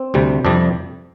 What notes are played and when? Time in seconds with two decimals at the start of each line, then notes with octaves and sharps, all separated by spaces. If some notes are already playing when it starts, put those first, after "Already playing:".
Already playing: C4
0.14 D2 C3 G3
0.45 F2 C3 G3 D4